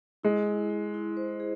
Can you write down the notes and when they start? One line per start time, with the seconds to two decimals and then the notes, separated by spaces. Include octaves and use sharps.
0.23 G#3 E4
0.47 E4
0.70 E4
0.94 E4
1.17 C5
1.40 G#4